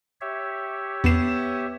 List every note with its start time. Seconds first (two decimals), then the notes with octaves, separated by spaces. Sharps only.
0.21 G4 C#5 E5
1.04 E2 B3 C7 E7